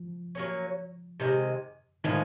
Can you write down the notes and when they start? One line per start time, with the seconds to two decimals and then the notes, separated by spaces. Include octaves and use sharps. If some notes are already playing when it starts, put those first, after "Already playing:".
Already playing: F3
0.35 F#3 A#3 C#4
1.20 C3 D#3 G#3
2.04 A2 D#3 F3 G#3